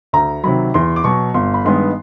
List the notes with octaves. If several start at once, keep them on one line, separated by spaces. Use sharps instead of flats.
D2 A#5
C3 D#3 F#3 B5
E2 C6
D6
B2 F#3 C#6
G1 C6
B5
G2 D#3 G#3 B3 C6